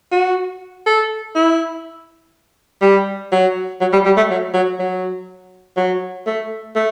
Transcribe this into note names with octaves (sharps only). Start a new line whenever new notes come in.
F#4
A4
E4
G3
F#3
F#3
G3
G3
A3
F#3
F#3
F#3
F#3
A3
A3